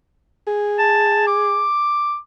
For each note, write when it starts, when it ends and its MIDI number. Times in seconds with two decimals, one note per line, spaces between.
0.47 1.66 68
0.79 1.24 81
1.27 2.18 86